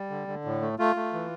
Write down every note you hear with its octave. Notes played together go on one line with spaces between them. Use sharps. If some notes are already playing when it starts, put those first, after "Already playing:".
Already playing: G3
D3
D3
A2
A3
A3 F4
A3
E3